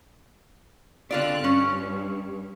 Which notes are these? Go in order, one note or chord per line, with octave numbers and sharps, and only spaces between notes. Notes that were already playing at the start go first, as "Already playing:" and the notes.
D3 C4 F4 D5 F#6
G2 C#4